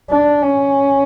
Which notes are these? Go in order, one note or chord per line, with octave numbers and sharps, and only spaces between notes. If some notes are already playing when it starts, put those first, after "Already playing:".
D4
C#4